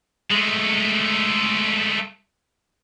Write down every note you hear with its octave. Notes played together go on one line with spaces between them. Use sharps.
G#3 A3